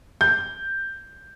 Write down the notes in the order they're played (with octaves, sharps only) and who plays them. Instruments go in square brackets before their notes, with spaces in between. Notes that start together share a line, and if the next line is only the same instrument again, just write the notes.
[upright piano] G6